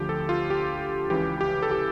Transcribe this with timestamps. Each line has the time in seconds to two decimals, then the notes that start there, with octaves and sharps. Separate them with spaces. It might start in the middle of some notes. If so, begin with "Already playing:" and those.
Already playing: D2 D3 F3 G4
0.09 A4
0.29 F4
0.50 G4
1.10 C#2 C#3 E3 G4
1.41 G4
1.63 A4
1.71 G4